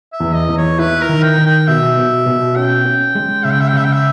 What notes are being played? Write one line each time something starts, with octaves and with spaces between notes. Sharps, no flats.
E5
E2
D#5
E2
C#5
E4 B4
A#4
D#3
G5
D#3
G5
B2 E5
B2
B2
C#4 G5
C#4
G#3
C#3 E5
G5
E5
G5
C#3 E5
G5
E5